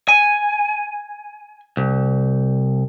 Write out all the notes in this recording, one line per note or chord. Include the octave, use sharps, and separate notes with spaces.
G#5
C2